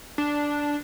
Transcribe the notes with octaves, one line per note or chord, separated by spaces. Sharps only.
D4